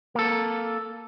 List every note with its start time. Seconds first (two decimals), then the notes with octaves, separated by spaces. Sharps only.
0.15 A#3 A4